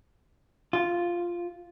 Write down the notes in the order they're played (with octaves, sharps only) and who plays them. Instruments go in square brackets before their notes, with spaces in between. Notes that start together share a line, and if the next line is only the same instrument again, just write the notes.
[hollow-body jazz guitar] F4